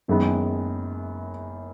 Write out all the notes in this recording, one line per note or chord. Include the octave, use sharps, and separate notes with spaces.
F#1 F#2 D#3 G#3 B3